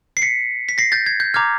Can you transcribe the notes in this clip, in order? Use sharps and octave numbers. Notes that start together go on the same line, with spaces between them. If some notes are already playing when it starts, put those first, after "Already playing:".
C7
B6 C#7
B6
A#6 C7
G6 A6
G#6
G6
A#5 D6 F6 G#6